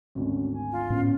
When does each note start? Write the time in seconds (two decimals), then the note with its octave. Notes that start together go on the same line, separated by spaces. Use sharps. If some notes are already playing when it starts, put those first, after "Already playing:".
0.15 G#1 D2 C#4
0.54 G#5
0.72 F4
0.90 A2 B3 C#4